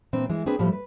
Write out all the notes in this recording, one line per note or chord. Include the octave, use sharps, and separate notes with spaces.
A#2 E3 C4 D4
E3 G#3
C4 D4 G#4 B4
A2 F3 G3 A3
B4